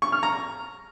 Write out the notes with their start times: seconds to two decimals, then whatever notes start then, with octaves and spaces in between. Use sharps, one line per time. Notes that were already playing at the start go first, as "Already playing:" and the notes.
0.02 C#6
0.12 F6
0.23 A#5